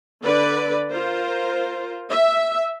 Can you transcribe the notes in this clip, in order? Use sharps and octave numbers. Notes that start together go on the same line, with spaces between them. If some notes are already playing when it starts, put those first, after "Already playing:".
D3 B4 D5
F4 A#4 C5
E5